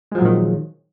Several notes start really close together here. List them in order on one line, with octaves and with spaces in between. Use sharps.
G#3 F3 F#3 A#2 D#3